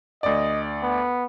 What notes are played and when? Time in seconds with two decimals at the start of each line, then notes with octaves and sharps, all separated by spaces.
0.23 D2 D5 D#5
0.83 B3